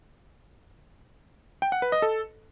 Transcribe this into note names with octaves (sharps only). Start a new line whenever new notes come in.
G5
F#5
B4
D#5
A4